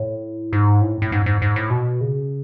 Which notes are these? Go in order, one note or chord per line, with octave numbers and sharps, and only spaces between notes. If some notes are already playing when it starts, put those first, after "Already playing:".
Already playing: A2
G#2
A2
A2
G#2
G#2
G#2
A2
B2
C#3